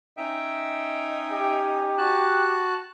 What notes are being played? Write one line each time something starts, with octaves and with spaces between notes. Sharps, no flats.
C#4 D#4 E5 G5
G4
F#4 A5 F#6